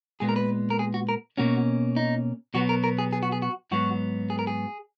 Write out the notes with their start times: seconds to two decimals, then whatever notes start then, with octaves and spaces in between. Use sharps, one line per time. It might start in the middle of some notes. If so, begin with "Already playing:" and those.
0.20 A#2 G#3 B3 G#4
0.29 A#4
0.36 B4
0.70 A#4
0.79 G#4
0.94 F#4
1.09 A#4
1.37 B2 A#3 C#4 F#4
1.96 D#4
2.54 B2 F#3 B3 F#4
2.69 A#4
2.84 A#4
2.99 G#4
3.13 G#4
3.23 F#4
3.32 G#4
3.42 F#4
3.71 G#2 F#3 B3 F#4
4.30 G#4
4.39 A#4
4.47 G#4